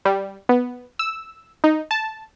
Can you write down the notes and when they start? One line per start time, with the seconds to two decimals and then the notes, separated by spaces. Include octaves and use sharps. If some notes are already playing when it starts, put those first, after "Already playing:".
0.05 G3
0.49 B3
0.99 E6
1.64 D#4
1.91 A5